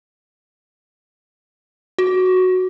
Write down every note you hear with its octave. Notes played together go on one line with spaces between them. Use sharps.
F#4